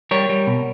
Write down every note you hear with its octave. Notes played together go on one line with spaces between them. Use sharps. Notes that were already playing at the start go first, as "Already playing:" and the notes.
G3 A#4 C#5
G3
B2